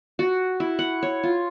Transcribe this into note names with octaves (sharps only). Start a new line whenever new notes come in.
F#4
E4
F#5
C#5
F4